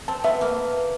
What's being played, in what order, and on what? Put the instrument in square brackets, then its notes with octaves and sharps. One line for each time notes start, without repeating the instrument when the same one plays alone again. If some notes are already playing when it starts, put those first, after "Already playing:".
[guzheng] C4 [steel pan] A5
[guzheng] B3 [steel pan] E5
[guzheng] A#3 [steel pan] A5